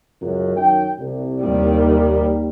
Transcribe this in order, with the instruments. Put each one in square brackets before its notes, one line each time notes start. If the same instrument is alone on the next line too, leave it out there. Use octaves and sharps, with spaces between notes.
[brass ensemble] C#2 F#2
F#2 D#3 G5
C2
[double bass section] D#2 D#3 G3